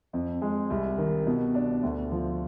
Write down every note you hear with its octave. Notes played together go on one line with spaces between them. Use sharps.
F2
G#3
C2
D#3
B2
D4
D2
F3